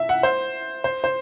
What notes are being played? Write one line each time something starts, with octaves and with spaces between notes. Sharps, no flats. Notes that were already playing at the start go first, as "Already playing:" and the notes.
Already playing: E5
F#5
C5
C5
C5